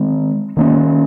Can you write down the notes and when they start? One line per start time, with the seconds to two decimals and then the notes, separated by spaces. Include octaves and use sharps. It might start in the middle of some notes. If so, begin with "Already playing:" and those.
Already playing: D#3 G#3 C4
0.57 D#3 A#3 C#4